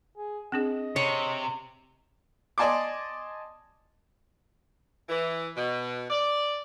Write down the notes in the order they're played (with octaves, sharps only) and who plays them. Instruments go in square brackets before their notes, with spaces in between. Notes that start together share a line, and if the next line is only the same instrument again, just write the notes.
[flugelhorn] G#4
[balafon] C4 D4 G#4 [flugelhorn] D#5
[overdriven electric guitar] C3 [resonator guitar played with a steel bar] C#5
[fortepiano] D5 D#5 G#5 A5 C6 D6
[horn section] E3
B2
D5